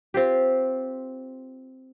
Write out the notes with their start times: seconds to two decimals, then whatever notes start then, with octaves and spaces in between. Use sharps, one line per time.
0.14 C4 F4 G4